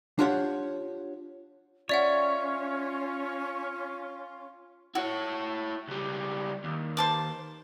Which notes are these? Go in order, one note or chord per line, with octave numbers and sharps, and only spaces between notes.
D4 F4 G4 C#5 F#5
C#4 F4 C#5 D5 E5 F#5
E4 F#4 C#5
C#2 G3
D#2
C5 A5 D6